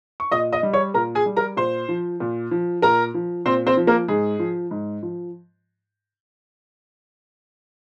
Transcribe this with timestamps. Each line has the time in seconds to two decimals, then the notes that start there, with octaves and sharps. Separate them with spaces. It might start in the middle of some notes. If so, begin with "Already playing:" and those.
0.20 C#6
0.31 A#2 D#5 D#6
0.52 D#5 D#6
0.63 G3
0.73 C#5 C#6
0.94 A#2 A#4 A#5
1.15 G#4 G#5
1.26 G3
1.36 A#4 A#5
1.57 A#2 C5 C6
1.88 F3
2.20 A#2
2.51 F3
2.82 A#2 A#4 A#5
3.14 F3
3.46 A#2 C4 C5
3.67 C4 C5
3.77 F3
3.87 A#3 A#4
4.08 G#2 G#4
4.39 F3
4.71 G#2
5.02 F3